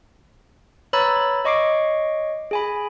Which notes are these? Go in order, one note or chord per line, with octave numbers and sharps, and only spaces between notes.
B4 C#5 A#5 B5 E6 A6
C#5 D#5 C#6 D6 C7 D7
G#4 G#5 B5